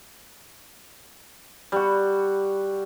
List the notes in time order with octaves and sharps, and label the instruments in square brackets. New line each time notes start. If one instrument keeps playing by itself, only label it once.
[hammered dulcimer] G3 F#4